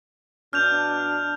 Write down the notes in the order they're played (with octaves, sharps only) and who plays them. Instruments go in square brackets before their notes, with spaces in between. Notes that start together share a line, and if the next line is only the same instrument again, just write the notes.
[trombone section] B2 D4 [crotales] F6 G6 F7